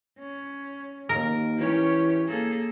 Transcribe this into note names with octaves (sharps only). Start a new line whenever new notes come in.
C#4
D#2 A#4
E3 C#4 G4 C#5
A#3 G#4 A4